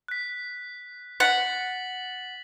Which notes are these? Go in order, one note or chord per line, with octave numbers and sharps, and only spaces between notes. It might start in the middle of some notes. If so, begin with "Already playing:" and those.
F#6 B6
F#5 A6 B6 F#7